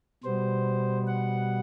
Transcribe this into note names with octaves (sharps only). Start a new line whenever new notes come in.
B2 G3 B3 C5
F#5